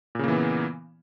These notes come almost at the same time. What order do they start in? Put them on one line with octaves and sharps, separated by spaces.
A#2 C#3 A#3 E3 B3